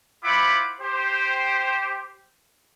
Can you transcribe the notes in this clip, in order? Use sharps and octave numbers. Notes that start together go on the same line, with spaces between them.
E4 F4 C5 F#5 B5 D6
G4 C5